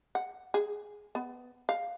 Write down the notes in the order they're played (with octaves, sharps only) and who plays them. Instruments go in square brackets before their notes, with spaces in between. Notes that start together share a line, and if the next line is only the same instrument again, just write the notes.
[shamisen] F#5
G#4
B3
F5